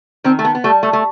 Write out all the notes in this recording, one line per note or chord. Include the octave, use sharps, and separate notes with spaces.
D#3 C4
A3
B3
B3
G3 A3
A3
A3